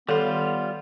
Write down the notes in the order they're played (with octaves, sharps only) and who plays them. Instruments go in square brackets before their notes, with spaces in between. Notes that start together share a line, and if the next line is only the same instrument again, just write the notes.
[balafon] D#3 A4 F5 [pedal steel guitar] G3 F4 [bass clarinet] B3